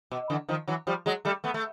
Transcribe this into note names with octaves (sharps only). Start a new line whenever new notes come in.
B2
D3 E3
D#3 F3
E3 F#3
F3 G3
F#3 G#3
G3 A3
A3 B3
A3